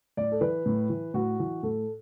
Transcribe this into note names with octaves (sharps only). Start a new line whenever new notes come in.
A2 D5
A4
E3 B4
A2
E3
A2 F#4
E3
A2 A4